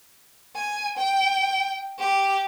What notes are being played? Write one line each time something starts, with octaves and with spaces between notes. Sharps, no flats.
G#5
G5
G4